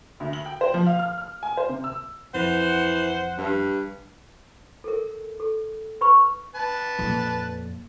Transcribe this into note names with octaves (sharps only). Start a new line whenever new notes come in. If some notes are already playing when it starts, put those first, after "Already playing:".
D2
F#7
G5
C5
F3
F5
F6
F6
G#5
C5
C3
E6
F2 E3 C5 F#5
G2
A4 A#4
A4
B4 B5 C#6
B4 A5
F2 A#2